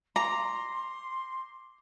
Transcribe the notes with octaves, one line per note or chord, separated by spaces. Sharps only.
A#5 C6 D6